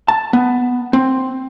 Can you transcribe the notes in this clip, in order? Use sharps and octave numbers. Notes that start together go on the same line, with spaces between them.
A5
B3
C4